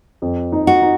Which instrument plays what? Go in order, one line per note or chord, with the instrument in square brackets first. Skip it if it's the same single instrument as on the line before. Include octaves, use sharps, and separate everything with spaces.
[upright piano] F2
D#4
[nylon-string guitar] F#4
[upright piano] D#4